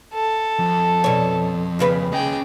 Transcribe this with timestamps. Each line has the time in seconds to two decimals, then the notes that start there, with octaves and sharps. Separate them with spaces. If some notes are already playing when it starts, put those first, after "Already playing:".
0.13 A4
0.59 F2
1.04 B2 C#5
1.79 D#2 C#3 B4
2.13 C#4 G#4 D#5 G5